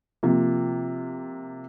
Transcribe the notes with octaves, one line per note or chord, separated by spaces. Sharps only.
C3 F3 A#3